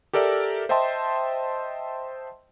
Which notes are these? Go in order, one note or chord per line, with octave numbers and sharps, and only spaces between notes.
G4 A4 A#4 D5 E5
C5 D#5 E5 G5 A5 C6